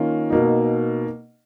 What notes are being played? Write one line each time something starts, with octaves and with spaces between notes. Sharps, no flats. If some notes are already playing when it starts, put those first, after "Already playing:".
Already playing: D#3 A#3 C#4 F4
B2 A#3 D#4